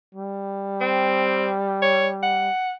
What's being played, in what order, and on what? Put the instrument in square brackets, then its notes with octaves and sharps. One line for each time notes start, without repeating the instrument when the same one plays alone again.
[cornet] G3
[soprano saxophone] C4
C#5
F#5